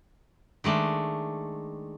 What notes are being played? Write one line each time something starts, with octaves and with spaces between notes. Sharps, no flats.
D#3 G#3 A3 D4